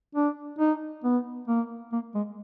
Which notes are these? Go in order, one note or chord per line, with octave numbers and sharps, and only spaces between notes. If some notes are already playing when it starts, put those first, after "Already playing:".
D4
D#4
B3
A#3
A#3
G#3